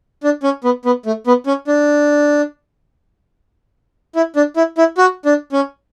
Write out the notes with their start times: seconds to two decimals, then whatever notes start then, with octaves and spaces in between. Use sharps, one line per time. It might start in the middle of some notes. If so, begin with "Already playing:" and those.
0.24 D4
0.43 C#4
0.64 B3
0.85 B3
1.06 A3
1.27 B3
1.46 C#4
1.67 D4
4.16 E4
4.36 D4
4.56 E4
4.78 E4
4.98 F#4
5.25 D4
5.52 C#4